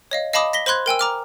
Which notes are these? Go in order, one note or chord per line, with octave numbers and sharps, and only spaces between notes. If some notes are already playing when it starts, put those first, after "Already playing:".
C#5 D#5 F5
D#5 F5 A5 B5 D6 D#6
A#6 B6 G7
C5 B5 C6 F#6 G#6
A#4 G5 G#5 E6
A#5 D6 F6